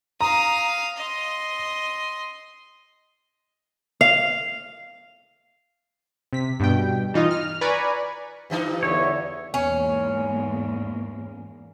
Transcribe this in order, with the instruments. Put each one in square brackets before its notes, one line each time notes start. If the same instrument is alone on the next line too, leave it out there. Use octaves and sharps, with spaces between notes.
[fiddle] F5 D#6 [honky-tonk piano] A#5
[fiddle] D#5 C6
[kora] F5
[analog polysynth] C3 B6
G2 B2 G5
E3 D#4 F4 D#5
F6
B4 D5 G#5 A#5 B5 C#6
[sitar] G2 E3 D#4
[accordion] E2 D3 E5 [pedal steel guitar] C#5
[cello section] E2 G#2 A#3 [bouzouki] C#4